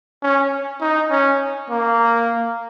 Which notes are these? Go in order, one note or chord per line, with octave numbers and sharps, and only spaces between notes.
C#4
D#4
C#4
A#3